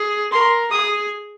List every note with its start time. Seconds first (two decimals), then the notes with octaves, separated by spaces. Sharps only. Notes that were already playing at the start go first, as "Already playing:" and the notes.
Already playing: G#4
0.33 A#4 C6
0.72 G#4 D#6